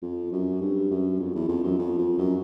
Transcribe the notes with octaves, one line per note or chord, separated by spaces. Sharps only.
F2
F#2
G2
F#2
F2
E2
F2
F#2
F2
F2
F#2